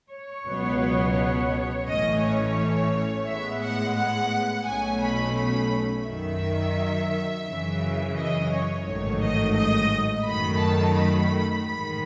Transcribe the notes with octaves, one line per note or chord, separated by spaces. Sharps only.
C#5
C#2 B2 F#3 B3
A1 A2 E3 A3 C#4 D#5
C#5
A2 G#3 B3 E5
F#5
F#5
B1 B2 A3 C#4 G#5
B5
B5
F#2 D#3 F#3 E5
F#2 C#3 E3
D#5
C#5
A1 G#2 D#3 F#3 A3 C#5
D#5
D#5
F#2 D#3 F#3 A3 B5
A5
B5
A1 G#2 D#3 G#3 B5